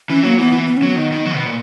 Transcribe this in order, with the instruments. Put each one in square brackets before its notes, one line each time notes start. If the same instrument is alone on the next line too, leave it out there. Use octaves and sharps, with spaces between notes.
[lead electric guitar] E3 [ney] C#4
[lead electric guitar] F#3 [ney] A#3
[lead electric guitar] E3 [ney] B3
[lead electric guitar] E3
[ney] B3
C#4
[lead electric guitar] F#3 [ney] B3
[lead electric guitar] D#3
D#3
F#3
B2
A#2